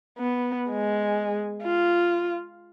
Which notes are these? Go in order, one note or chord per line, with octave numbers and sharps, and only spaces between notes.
B3
G#3
F4